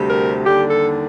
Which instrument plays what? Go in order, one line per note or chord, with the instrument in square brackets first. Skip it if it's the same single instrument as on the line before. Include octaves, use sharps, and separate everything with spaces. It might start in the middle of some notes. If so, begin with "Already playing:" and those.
Already playing: [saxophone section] D2 C3 G3
A#4
D#2 D3 G3 G4
A4